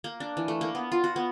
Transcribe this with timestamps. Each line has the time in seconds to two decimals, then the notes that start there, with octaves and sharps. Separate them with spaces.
0.04 A#3
0.20 D4
0.37 E3
0.48 A3
0.61 A#3
0.75 B3
0.92 F4
1.04 F#4
1.16 B3